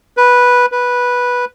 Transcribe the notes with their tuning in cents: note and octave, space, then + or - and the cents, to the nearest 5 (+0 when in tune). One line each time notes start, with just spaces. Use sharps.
B4 -10
B4 -10